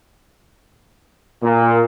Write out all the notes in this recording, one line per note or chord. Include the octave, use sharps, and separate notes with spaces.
A#2